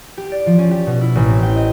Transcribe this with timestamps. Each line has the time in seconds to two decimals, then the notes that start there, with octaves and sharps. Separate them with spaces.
0.18 G4
0.32 D5
0.46 F3
0.58 C#4
0.71 G4
0.87 B2
1.01 E4
1.15 A1
1.29 C4
1.43 G5
1.56 D#5